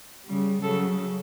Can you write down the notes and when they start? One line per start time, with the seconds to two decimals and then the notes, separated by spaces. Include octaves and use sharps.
0.25 C#3 G3
0.61 C#3 F#3 A4